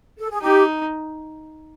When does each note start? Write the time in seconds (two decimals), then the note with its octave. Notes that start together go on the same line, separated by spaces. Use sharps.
0.18 A4
0.30 G#4
0.42 D#4 G4